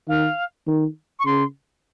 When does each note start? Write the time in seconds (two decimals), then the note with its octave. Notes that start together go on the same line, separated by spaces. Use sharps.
0.08 D#3 F5
0.67 D#3
1.19 C#6
1.25 C#3 C6